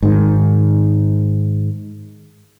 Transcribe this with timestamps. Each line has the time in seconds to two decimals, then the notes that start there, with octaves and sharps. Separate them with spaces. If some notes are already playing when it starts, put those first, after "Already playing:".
0.03 G#2 D#3